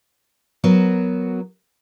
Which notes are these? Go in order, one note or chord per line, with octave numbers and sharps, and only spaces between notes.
F#3 B3 F#4 A#4